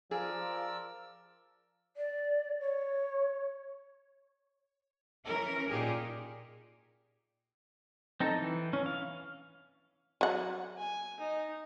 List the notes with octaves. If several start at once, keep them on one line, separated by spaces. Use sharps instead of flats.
F3 G#4 A#4 D5 E6
D5
C#5
E3 C#4 A#4
A#2 D#4 F4 G4 G#4
C4 D#4 A4
E3
C#4
F5
F#3 F#5
G#5
D#4